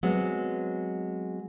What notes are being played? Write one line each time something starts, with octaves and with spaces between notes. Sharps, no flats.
F#3 G#3 B3 C4